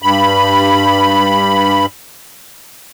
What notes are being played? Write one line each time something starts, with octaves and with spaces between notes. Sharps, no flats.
G2 B5